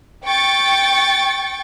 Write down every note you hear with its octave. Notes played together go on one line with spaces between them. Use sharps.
G5 C#6 A6